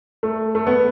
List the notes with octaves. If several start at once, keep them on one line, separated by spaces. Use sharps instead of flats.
A3
A3
B3